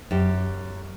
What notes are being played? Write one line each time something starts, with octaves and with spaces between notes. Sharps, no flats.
F#2 G4